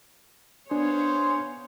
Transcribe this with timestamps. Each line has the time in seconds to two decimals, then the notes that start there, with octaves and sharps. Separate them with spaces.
0.71 B3 D4 G#4 C5 C#5 F5